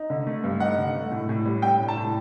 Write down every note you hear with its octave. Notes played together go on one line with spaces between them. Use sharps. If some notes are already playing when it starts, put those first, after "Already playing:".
Already playing: D#4
D3
A3
G2
D#4 F#5
D3
A3
A2
A2
G3
D4 G5
A2
A5
A2